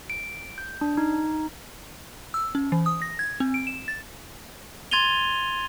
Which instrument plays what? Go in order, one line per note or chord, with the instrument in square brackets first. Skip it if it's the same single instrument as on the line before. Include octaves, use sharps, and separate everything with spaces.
[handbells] D7
G6
D4
D#4
[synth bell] E6
C#4
E3
D#6
A#6
G#6
C4
D7
E7
A6
[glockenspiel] C6 G#6 A6 D#7 F7 G7